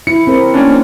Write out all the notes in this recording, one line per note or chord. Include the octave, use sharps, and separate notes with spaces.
E4 C#7
C4 A#4
A#3 C#4 D4